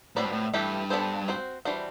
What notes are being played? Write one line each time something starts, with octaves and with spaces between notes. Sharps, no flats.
A2 C4 F#4 B4 D5
G2
A2
G2 E3 A3 E4 G4
B3 D4 A4 C5
C4 F#4 C5
E3 G3 D4 F#4 C5